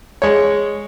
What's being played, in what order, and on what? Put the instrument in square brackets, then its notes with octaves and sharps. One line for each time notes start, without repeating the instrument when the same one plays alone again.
[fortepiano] G#3 C#5